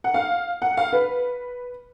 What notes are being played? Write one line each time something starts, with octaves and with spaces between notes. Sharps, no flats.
F#5
F5
F#5
F5
B4